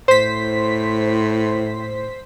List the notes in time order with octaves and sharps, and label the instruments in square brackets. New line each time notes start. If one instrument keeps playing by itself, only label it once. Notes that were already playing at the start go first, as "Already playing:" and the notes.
[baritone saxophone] A2 [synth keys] C5 B6